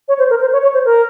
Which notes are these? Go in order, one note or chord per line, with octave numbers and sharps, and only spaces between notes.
C#5
C5
A#4
C5
C#5
C#5
C5
A#4